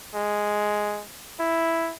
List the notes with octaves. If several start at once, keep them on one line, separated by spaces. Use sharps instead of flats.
G#3
E4